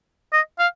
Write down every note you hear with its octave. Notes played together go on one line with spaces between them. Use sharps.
D#5
F5